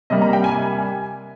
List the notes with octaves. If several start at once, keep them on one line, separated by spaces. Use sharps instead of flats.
C3 G3 A#3 D#5
A#5
G5
G#5
G#5
G#5